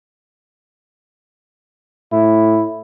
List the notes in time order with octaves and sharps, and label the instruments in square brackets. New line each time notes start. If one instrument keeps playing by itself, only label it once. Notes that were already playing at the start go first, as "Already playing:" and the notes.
[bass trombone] A2 [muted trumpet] E4